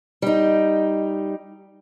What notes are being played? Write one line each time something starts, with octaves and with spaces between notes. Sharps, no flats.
G3 D#4